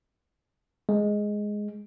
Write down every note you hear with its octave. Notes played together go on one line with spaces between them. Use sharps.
G#3